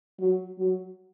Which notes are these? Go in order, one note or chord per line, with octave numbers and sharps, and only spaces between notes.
F#3
F#3